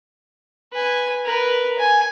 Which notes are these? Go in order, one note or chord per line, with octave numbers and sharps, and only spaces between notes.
B4 G#5
A#4 B4
G#5